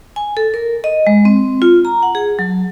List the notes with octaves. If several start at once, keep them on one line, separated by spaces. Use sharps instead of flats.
G#5
A4
A#4
D#5
G#3
C4
F4
A#5
F#5
G#4
F#3